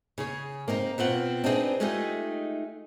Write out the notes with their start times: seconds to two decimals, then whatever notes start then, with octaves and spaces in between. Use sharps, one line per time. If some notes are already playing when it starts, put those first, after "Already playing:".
0.18 C#3 G#4 C#5
0.68 A#3 C4 D#4 A#4
0.98 B2 C4 F4 F#5
1.44 C4 D4 D#4 F4 G#4 B4
1.80 G#3 A3 D#4 F4 G4 G#4